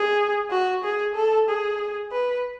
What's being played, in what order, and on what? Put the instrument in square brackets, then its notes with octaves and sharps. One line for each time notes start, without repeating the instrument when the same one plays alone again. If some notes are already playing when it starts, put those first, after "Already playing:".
Already playing: [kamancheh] G#4
F#4
G#4
A4
G#4
B4